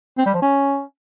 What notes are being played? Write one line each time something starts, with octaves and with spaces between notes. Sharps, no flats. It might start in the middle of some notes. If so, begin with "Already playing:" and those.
C4
G3
F3
C#4